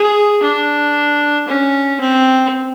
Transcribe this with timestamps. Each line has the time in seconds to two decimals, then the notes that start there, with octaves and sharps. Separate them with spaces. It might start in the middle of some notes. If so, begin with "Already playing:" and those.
Already playing: G#4
0.43 D4
1.48 C#4
2.01 C4